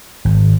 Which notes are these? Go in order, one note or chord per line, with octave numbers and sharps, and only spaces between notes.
G#1